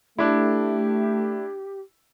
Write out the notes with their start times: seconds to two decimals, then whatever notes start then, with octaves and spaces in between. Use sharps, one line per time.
0.18 A3 D4 E4 G4